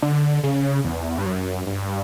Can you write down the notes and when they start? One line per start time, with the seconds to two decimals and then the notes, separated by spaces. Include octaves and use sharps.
0.02 D3
0.43 C#3
0.84 E2
1.18 G2
1.25 F#2
1.66 G2